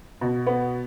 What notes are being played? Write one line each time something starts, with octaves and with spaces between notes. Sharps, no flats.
B2
B3